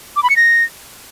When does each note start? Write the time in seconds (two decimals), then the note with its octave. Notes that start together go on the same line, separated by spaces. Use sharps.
0.16 D6
0.23 B5
0.30 C#7
0.36 A#6